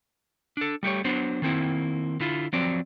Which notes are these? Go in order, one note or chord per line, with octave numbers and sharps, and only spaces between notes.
D4 A4
G3 A3 G4 C#5
F#3 B3 D4 C5
D#3 A#3 C4 E4
D3 E4 F4
F3 F#3 C4 D5